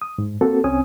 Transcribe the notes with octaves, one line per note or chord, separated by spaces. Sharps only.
D#6
G#2
A#3 C4 F#4 A4 A5
C2 C4 C#4 G#5 D#6